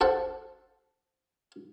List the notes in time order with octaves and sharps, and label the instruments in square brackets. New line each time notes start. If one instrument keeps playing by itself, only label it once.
[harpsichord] A4 C5 F#5